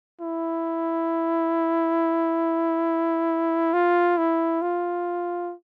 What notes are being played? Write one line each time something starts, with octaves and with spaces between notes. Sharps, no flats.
E4
F4
E4
F4